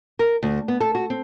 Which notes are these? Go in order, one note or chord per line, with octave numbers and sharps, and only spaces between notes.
A#4
D2
B3
A4
F#4
C4